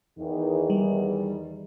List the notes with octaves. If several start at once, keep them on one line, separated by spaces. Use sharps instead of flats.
E2 D#3 D#4
G3